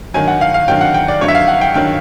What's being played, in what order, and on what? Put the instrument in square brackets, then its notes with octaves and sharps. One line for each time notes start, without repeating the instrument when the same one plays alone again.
[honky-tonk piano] G2 D#3 F#3 [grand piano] G#5
[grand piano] F#5
F5
F5
[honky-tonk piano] G2 D#3 F#3 [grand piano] G5
[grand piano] F#5
G5
D5
[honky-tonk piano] G2 D#3 F#3 [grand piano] C#5
[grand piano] E5
F5
F#5
G5
[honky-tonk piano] G2 D#3 F#3 [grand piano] G5